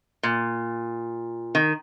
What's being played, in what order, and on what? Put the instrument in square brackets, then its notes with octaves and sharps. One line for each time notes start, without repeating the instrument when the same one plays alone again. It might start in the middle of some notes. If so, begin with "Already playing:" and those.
[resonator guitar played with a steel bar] A#2
D#3